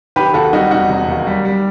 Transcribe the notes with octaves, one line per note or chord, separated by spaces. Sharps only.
D#3 G4 B4
D#2 F#4 A4
G3 D#4 F#4
E1 D#4 F#4
E1
D#2
G3
G3